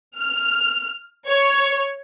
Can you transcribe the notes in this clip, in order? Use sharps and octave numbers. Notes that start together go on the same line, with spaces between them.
F6
C#5